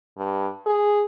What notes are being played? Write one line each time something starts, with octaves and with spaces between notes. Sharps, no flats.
G2
G#4